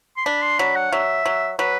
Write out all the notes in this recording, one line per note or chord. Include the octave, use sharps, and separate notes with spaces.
C6
D4 B5
C6
F#3 B5
F#5
F#3 E5
F#3
F#3 B4